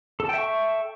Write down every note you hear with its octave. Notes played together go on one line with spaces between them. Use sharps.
A4 E5 G5 A5 C#6